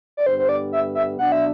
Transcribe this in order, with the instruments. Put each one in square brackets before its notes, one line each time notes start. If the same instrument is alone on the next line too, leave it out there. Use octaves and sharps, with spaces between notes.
[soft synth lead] D5
[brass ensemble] G2 D3 G3 B3 [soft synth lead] C5
[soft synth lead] C5
D5
E5
E5
[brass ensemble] B2 F#3 B3 D4 [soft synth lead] F#5
[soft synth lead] E5